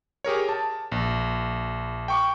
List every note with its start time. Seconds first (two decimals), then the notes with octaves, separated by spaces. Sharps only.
0.24 G4 G#4 A#4 C#5
0.49 A5
0.92 A#1
2.08 G5 C#6 D6